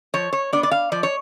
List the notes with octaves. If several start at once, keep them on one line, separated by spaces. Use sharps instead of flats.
F3 C#5
C#5
B3 D4 D5
D5
F5
F3 D5
C#5